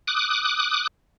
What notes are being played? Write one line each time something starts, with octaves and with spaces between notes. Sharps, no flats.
D6 D#6 F#6